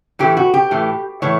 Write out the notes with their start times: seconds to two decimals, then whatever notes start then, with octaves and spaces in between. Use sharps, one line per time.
0.19 A2 E3 A3 G4
0.37 F#4
0.54 G4
0.71 A2 E3 A3
1.22 A2 E3 A3 C#5